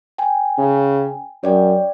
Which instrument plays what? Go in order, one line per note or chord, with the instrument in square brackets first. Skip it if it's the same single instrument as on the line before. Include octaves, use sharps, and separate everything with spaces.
[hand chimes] G5 G#5
[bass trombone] C#3
[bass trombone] F#2 [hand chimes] C#5 D5 G5